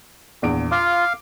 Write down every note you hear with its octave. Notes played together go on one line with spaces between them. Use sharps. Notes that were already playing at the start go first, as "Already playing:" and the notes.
A#1 E2 D7
F4 F5 D6